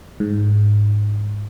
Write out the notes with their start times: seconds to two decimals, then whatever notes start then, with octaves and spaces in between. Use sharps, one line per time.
0.20 G#2